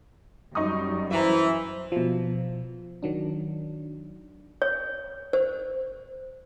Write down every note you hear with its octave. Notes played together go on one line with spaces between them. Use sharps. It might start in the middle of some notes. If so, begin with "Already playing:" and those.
F#2 G3 D#4 C#6 D#6
E3 C5 E5 A#5
B2 F3
D#3 F#3 D4
C#5
C5